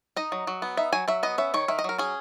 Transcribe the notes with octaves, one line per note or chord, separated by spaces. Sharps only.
D#4 D#5
F#3
F#3
B3
D#4 E5
F#3 G#5
F#3 E5
B3 D#5
C#4 E5
D#3 C#5
D#3 E5
D#5
F#3 A#4
C#4 G#4